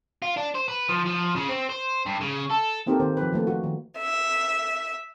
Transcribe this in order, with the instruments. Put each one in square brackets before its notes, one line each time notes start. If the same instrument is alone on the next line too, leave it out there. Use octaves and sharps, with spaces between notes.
[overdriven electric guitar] F4
D4
C5
B4
F3
F3
C#3
C4
C5
G2
C#3
A4
[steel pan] A#3 C4 D#4 G4 A4 A#4
D#3 A#3 C5
F3 B4
F3 A3 A#3 A4
F#4
D#3
[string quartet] E5